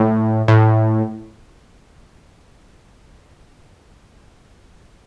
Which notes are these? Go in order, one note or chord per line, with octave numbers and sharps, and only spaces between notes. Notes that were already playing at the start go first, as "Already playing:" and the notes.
Already playing: A2
A2